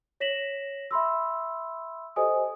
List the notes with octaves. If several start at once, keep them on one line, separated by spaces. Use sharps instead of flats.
C#5 A#6 B6 E7 F#7
E5 B5 C6 E6
G4 A4 C5 D#5 G#5 D#6